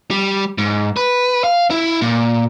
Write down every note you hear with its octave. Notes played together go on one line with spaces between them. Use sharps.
G3
G#2
B4
F5
E4
A#2